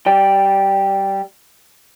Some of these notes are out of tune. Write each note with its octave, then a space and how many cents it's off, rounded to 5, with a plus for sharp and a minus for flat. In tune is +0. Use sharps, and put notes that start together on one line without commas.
G3 -20 D5 +0 G5 +0